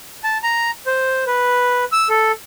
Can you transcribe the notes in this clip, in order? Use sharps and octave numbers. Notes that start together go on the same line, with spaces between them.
A5
A#5
C5
B4
E6
A4